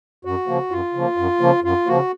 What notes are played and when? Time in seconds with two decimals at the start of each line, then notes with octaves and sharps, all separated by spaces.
0.25 F#2 F#4
0.47 C#3 F3 A#3
0.71 F#2 F4
0.94 C#3 F3 A#3
1.17 F#2
1.40 C#3 F3 A#3
1.63 F#2 F4
1.87 C#3 F3 A#3 F#4